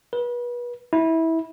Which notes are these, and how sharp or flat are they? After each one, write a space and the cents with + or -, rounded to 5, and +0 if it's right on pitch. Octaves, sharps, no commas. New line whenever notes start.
B4 -35
E4 -20